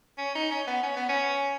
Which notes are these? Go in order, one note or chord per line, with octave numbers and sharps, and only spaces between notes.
C#4
D#4
C#4
B3
C#4
B3
C#4